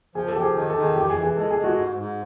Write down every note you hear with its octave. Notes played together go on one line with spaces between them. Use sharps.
F3 G#4
A4
F3 G4
G#4
D#3 G#4
A4
D#3
G#4
F2 G4
G#4
E3
G#4
G#3 A4
G#4
G#3
F#4
G#2
G#2